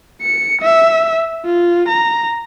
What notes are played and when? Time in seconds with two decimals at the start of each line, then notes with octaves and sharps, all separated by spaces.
0.22 C#7
0.61 E5
1.45 F4
1.89 A#5